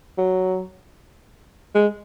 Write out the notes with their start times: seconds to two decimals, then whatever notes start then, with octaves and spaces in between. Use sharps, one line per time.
0.18 F#3
1.75 G#3